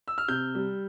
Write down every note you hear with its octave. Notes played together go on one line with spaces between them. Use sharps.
E6
F6
C3 G6
G3